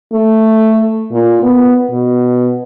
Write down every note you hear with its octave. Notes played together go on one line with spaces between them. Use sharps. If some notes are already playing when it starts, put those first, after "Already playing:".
A3
A#2
B3
B2